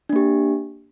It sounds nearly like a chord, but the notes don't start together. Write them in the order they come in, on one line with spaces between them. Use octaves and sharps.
D4 A#3 G4